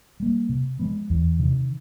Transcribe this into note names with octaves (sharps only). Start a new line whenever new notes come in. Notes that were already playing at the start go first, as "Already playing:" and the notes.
G3 A#3
C3
F3 G#3 B3
E2
C3 D#3